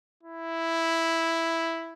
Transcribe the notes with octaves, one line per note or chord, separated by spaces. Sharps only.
E4